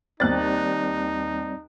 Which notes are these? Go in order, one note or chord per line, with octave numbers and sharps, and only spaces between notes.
D#2 G3 C4 D#4 D5 F#6 A6